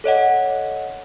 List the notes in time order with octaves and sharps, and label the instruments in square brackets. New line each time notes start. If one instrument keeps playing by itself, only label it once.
[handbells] A4 C#5 D#5 F#5